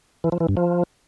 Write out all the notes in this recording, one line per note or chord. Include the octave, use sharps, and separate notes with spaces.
E3
F3
E3
G2
F3